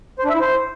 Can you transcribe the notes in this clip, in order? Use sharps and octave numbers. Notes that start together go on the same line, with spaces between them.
C5
D4
E5
E4
C5